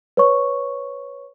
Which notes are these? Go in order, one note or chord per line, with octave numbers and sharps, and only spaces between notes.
B4 C#5 C#6